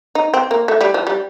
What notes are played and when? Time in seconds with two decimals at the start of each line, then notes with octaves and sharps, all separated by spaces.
0.15 D#4
0.34 C4
0.51 A#3
0.68 A3
0.81 G3
0.94 F3
1.07 G3